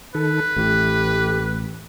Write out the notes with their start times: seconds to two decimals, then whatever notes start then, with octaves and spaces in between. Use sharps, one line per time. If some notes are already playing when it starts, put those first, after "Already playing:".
0.15 D#3 A4 B4
0.56 A1 E3 A3 G4